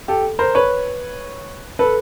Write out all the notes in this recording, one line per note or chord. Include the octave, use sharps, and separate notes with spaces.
G4 A4
A#4 C5
B4 C#5
A4 B4